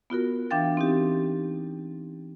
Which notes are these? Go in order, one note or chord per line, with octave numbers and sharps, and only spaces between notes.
B3 F4 F#4 A#4
E3 D4 F5 G5 A6
C4 D#4 G4